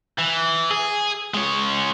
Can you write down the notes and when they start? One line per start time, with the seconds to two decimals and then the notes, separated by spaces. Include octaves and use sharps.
0.18 E3
0.71 G#4
1.34 G#3 C#5